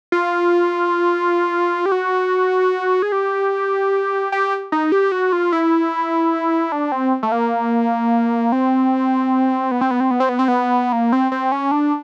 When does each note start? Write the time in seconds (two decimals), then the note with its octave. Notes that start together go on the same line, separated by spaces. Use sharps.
0.12 F4
1.86 G4
1.92 F#4
3.02 G#4
3.12 G4
4.32 G4
4.72 D#4
4.92 G4
5.12 F#4
5.32 F4
5.52 E4
6.72 D4
6.92 C4
7.23 A3
7.32 A#3
8.52 C4
9.71 B3
9.81 C4
9.91 B3
10.00 C4
10.11 B3
10.20 C4
10.29 B3
10.39 C4
10.48 B3
10.92 A#3
11.12 C4
11.32 C4
11.52 C#4
11.71 D4